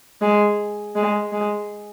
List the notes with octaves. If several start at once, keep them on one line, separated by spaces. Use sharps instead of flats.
G#3
G#3
G#3